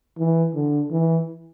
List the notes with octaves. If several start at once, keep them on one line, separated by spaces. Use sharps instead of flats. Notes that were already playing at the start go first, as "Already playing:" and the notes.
E3
D3
E3